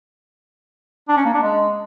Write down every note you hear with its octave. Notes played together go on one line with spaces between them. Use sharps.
D4
C#4
A#3
D4
G#3